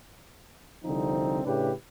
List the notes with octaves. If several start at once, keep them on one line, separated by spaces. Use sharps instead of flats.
C2 D3 F3 C4 D#4
A2 C#3 D4 G4 B4